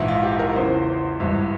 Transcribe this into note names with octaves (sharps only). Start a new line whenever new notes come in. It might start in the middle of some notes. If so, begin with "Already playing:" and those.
Already playing: A#1 G#2 E3 E4
F4
G4
A#4
E2 C#3 E3 C5
G#1 G2 E3 E5